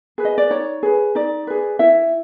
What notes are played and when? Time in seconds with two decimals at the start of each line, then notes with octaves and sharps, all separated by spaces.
0.18 G#4 B4
0.25 D#5
0.38 D5
0.50 D#4 C#5
0.83 G#4 B4
1.15 D#4 D5
1.47 G#4 B4
1.79 E4 E5